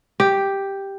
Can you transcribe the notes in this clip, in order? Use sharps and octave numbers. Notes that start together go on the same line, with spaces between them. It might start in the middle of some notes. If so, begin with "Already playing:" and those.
G4